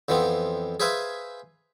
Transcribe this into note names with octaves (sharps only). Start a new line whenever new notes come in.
F2 E3 F3 B3 C4
G#4 B4 C5 E5 F5 G#5